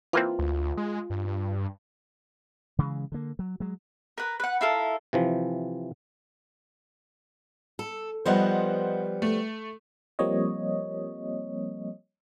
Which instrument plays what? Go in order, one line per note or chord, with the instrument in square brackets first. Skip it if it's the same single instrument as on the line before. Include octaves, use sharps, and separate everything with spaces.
[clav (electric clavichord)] E3 A#3 C4 [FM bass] F4
[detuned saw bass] D2
G#3
G2
[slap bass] C#3 E3 G#3
D3 A#3
F#3
F#3 G#3
[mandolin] A#4 B4
B4 F#5
E4 F4 A4 A#4
[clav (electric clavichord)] C3 E3 F3
[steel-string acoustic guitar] A4
[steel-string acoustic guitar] F3 G3 B3 [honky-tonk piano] C5 D#5 F#5
[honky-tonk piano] A3
[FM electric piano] F3 G3 A#3 C4 C#5 D#5